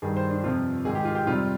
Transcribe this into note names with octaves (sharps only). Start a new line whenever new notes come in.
G2 D#3 G3 G#4
C5
D4
F2 C3 F3 F4
G#2 D#3 G#3 G#4
G4
F4
G4
F2 C3 G3 F4